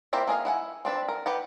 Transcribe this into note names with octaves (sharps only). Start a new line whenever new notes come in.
A#3 C4 E4 G4 E5
A#3 G#4 D#5 F5
E4 F#5 G#5
C4 D4 B4
A#4
G4 B4 F#5